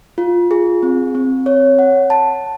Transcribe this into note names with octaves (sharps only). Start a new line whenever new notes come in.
F4
G#4
C4
C4
C#5
F#5
A5